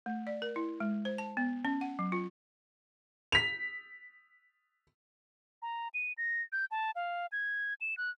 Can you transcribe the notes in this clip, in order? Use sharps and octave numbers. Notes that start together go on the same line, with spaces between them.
A3
D5
A#4
E4
G#3
C5
A5
B3
C#4
F#5
F#3
F4
B6 F7
A#5
D#7
A#6
G6
A5
F5
G#6
E7
F#6